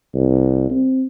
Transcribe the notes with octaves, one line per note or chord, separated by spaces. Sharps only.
C2
C4